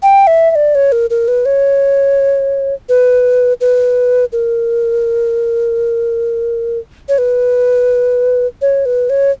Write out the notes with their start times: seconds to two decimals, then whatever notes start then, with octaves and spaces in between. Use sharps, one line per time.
0.03 G5
0.27 E5
0.51 E5
0.55 D5
0.75 C#5
0.92 A#4
1.10 A#4
1.28 B4
1.45 C#5
2.89 B4
3.61 B4
4.32 A#4
7.09 C#5
7.18 B4
8.62 C#5
8.86 B4
9.10 C#5